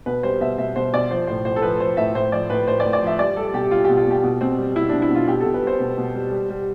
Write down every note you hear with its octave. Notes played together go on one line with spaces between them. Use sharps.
B2 B4
G3 C5
B2 E5
B2 E5
B2 C5
B2 D5
F3 C5
A2 C5
A2 C5
A4
F3 B4
F3 C5
A2 E5
A2 C5
F3 D5
A2 B4
A2 C5
D5
A2
D5
F3
E5
G3 D5
G3 A4
B2 G4
G3 F4
B2 G4
F4
B2 G4
B2
B2 C4
G3
B2 E4
B2 D4
E4
B2 F4
B2 G4
B2 A4
B4
G3 C5
B2
B2
G3
G3
G3